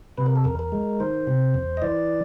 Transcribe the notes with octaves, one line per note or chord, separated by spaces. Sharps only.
C3 B4
A#4
A4
E2 A#4
A#4
G#3
D#3 C5
C3
E2
D#5
E3 D5